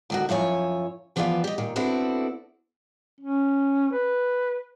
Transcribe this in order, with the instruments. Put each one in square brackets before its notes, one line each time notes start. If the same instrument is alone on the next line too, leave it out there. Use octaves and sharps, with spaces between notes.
[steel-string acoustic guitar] D2 D#3 F#4
F#2 F3 E4 C#5 G#5
E3 F3 B3 B4 D5 F5
G4 D#5
A#2 D#3
B3 C4 D4 E4 F#4 A4
[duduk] C#4
B4